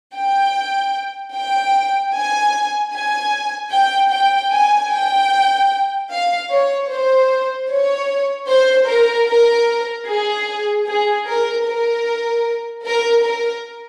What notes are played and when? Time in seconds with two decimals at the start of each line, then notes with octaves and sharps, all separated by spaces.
0.15 G5
1.34 G5
2.13 G#5
2.93 G#5
3.72 G5
4.11 G5
4.51 G#5
4.91 G5
6.10 F5
6.50 C#5
6.90 C5
7.69 C#5
8.48 C5
8.88 A#4
9.28 A#4
10.07 G#4
10.87 G#4
11.27 A#4
11.66 A#4
12.85 A#4
13.24 A#4